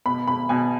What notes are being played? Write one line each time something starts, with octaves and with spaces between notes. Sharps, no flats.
B2 B5
B2 B5
B2 G#5